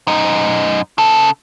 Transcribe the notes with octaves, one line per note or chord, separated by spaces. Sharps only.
F#2 D#4
C#3 A4